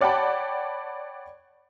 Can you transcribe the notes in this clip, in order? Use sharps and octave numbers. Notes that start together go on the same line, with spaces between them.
C#5 D5 F#5 G5 A5 B5